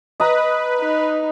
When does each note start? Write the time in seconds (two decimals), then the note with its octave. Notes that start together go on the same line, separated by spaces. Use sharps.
0.20 B4 D#5 A#5
0.79 D#4